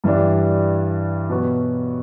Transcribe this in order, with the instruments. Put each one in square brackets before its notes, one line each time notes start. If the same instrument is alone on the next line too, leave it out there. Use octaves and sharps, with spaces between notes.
[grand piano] G2 E3 G3 D4
B2 F#3 B3 F#4